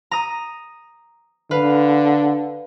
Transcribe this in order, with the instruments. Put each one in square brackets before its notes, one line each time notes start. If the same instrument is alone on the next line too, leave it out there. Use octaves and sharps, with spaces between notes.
[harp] A#5 D#6
[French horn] D3 [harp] B4 F5